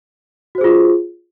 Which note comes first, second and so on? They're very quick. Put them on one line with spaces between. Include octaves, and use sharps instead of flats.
F#4 C5 G#4 F4